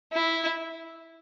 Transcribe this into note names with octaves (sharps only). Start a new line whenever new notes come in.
E4